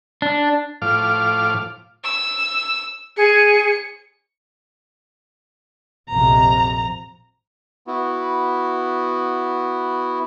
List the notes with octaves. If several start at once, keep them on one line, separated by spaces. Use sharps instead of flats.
D4
A2 F3 D6 F6
E6
G#4 C#7
A#1 F2 C3 A#5
B3 E4 F#4